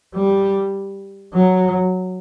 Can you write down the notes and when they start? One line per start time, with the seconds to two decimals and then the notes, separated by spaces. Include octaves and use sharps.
0.15 G3
1.33 F#3